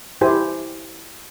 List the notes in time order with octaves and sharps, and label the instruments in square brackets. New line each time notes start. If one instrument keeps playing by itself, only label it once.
[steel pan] E4 G4 C5 G#5